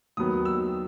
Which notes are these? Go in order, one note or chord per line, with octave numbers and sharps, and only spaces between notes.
D#2 D#3 F#3 B3 D#6
E6